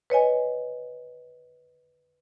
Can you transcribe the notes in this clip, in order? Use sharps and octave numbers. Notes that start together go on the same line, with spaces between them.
B4 C#5 D#5 G#5